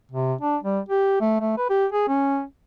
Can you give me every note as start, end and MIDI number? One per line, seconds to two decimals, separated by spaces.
0.12 0.34 48
0.41 0.56 62
0.63 0.79 55
0.89 1.19 67
1.21 1.39 57
1.41 1.57 57
1.58 1.70 71
1.70 1.86 67
1.92 2.07 68
2.08 2.42 61